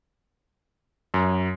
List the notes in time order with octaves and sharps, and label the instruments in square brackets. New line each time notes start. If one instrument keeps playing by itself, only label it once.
[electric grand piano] F#2